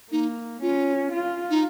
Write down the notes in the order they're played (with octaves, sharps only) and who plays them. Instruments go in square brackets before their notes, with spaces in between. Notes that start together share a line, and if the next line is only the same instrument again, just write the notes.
[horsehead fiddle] A#3 [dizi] D#4
[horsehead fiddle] C#4 [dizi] F4
[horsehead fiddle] F4
[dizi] D#4